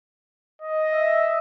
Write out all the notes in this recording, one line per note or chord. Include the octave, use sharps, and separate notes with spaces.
D#5
E5